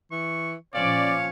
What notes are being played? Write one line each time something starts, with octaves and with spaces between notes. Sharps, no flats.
E3 C#6
A#2 F3 C#4 C#5 D5 F5